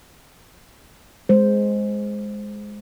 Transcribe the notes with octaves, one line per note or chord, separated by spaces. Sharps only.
G#3 C5